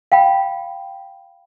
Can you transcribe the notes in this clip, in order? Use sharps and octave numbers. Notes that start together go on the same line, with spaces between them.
F5 G5 B5